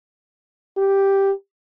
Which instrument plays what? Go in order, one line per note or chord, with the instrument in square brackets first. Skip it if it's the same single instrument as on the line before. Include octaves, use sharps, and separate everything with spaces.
[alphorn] G4